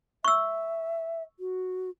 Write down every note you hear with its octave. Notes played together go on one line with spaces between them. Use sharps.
E5 C#6 E6
F#4